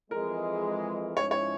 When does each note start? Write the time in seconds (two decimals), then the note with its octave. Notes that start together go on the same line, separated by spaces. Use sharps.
0.11 F2 E3 G#3 A#4
1.16 G#2 F3 G#3 C#4 E4 C#5
1.31 C#5